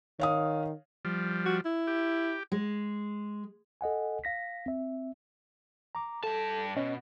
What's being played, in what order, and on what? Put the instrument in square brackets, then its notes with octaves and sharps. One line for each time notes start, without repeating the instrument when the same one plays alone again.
[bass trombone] D#3 [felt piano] C#5 F5 D#6
[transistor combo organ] F3 G3
[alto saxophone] F#4
E4
[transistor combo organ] G4
[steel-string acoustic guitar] G#3
[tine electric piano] A4 D#5 F#5 G#5
F5 A#6 B6
C4 E5
[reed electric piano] A#5 D6
[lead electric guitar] G2 A5 [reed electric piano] A4
[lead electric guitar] B2 [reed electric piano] C#4 D#5